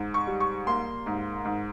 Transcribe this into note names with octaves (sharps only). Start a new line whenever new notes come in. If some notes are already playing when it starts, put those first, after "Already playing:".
Already playing: G#2
C#6
G3
C#6
A#3 C6
G#2
G#2